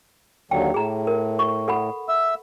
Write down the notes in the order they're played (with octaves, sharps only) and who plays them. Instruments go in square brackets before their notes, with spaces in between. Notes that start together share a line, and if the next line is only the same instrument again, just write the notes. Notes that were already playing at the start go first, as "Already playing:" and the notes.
[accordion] D#2 D3 F#3 [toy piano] G5
[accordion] A2 [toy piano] G#4 A#5
[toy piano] A#4
C#6
A4 F#5 B5
[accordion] E5 E6